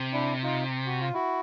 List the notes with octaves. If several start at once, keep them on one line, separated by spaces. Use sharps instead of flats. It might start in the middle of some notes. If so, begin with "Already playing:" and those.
Already playing: C3
D4 E4
D#4 F4
F#4
F4
E4 F#4